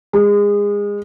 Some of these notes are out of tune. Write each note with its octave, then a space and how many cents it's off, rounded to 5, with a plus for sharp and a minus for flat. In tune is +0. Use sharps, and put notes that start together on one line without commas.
G#3 -25